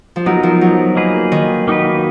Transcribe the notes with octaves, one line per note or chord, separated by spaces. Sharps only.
F3
F#3 B3 D#4 A#4
F3
F#3
A#3 D#4 G#4 B4
D#3
A#3 D#4 F#4 B4